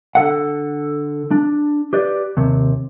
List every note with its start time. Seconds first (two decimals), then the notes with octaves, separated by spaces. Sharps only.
0.15 D3 A4 F#5
1.31 D4
1.93 G4 B4 D5
2.37 D#2 C3